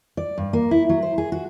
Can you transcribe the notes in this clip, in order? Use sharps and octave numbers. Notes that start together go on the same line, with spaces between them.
D5
G2
A#3
E4
F#3
C5
G#4
F#4